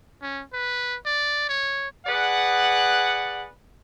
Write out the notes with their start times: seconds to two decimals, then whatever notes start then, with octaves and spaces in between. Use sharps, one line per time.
0.22 C#4
0.53 B4
1.06 D5
1.49 C#5
2.06 G#4 B4 D5 F#5